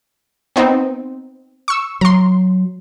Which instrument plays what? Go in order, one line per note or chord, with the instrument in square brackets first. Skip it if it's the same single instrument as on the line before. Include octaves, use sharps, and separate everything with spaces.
[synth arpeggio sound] B3 C4 D#4
C#6 E6
[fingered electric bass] F#3 [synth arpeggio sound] A#5 C6